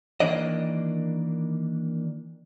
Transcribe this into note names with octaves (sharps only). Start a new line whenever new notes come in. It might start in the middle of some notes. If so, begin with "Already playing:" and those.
D#3 E3 A#3 D4 D5 D#5